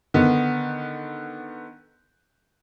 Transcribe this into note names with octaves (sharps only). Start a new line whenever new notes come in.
D3 D#3 B3